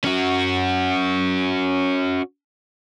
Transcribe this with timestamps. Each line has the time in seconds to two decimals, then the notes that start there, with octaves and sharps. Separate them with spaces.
0.05 C#4 F#4